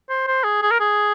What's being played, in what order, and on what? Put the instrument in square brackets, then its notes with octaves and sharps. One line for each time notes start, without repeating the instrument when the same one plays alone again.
[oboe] C5
C5
G#4
G#4
A#4
G#4